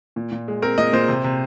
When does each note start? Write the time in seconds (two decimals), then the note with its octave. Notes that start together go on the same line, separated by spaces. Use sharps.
0.16 A#2
0.32 A#2
0.48 G#3
0.62 C4 A#4
0.78 A#2 D#5
0.93 A#2 C5
1.08 C3
1.24 C3